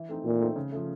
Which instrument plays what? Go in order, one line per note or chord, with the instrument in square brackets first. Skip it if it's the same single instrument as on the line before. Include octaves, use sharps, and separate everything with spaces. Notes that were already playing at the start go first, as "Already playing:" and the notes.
Already playing: [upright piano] E3
A3 C4 D#4
[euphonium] A#2 [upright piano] E3
[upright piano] A3 C4 D#4
C#3
F3 A3